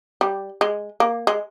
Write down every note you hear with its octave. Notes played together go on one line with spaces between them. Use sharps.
G3
G#3
A#3
G#3